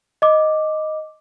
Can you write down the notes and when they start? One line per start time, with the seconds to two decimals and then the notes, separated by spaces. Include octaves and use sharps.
0.22 D#5 D6